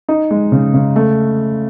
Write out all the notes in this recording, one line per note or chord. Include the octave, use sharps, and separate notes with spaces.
D#4
G#3
C#3
C#3
A3